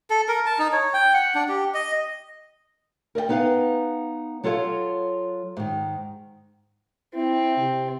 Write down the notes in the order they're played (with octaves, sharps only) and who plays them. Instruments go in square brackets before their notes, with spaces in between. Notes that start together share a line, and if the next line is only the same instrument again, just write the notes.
[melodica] A4
A#4
A5
D#4
C#5
G5
F#5
D4
G4
D#5
[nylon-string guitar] A#4 D5 D#5 G5
B3 D#4 B4 C#5 F5 G5
F#3 F4 A4 B4 C#5 F5
G#2 D#3
[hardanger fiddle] C4 [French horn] E4
[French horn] C3